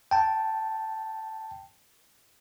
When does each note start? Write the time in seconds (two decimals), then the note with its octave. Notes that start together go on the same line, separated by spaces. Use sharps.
0.11 G5 A5